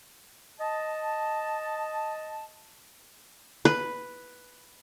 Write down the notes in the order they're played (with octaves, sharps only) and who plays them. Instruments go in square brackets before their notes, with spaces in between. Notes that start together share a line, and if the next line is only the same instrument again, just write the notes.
[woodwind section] D#5 A5
[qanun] B4